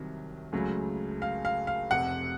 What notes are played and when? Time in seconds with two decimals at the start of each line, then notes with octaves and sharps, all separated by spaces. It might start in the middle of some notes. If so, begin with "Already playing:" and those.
Already playing: C2 C3 D#3 F#3
0.52 C#2 C#3 F#3 A3
1.22 F5
1.45 F5
1.67 F5
1.90 F1 F2 C3 F#5